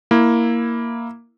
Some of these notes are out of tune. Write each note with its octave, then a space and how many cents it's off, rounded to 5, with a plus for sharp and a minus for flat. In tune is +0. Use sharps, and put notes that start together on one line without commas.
A#3 +0 E4 +0